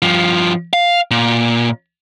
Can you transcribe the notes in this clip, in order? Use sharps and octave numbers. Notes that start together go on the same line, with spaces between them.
G2 F3
F5
A#2